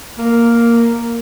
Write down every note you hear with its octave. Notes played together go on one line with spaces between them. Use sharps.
A#3